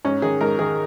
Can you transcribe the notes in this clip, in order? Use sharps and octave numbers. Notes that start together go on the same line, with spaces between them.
G#2 C#4
D#3 G#4
G#2 A#4
D#3 G#4